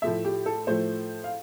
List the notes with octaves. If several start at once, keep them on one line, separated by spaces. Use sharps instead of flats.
A2 F3 A3 E5
G4
A4
A2 F3 A3 C5
F5